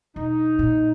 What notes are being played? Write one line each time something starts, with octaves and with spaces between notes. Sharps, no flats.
E1 D#4
A#2